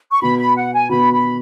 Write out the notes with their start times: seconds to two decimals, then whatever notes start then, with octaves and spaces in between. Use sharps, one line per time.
0.10 C#6
0.21 B2 B3 F#4 B5
0.39 B5
0.56 F#5
0.73 G#5
0.90 B2 B3 F#4 B5
1.13 B5